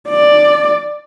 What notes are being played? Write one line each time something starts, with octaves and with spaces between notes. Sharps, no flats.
D5